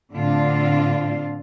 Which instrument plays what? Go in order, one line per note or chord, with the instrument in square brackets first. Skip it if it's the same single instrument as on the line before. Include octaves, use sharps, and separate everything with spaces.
[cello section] A2 D3 C4 D4 F4